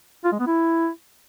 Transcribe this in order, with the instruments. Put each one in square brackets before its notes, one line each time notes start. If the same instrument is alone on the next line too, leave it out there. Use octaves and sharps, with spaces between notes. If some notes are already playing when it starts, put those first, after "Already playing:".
[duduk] F4
G#3
B3
E4